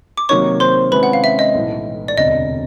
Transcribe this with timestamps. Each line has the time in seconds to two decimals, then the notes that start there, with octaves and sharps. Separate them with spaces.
0.17 D6
0.29 C3 D#3 F#3 A#3 D#4 C#5 C#6
0.60 C5 C6
0.92 C3 D#3 G#3 C#4 E4 B4 B5
1.03 F#5
1.13 F5
1.24 E5
1.39 D#5
1.55 B1 A2 E3
2.08 D5
2.17 E1 D2 C3 D#5